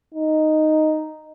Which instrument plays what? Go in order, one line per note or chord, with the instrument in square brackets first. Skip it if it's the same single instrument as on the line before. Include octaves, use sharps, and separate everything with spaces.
[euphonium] D#4